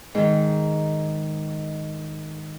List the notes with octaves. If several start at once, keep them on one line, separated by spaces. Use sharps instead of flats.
G#2 D#3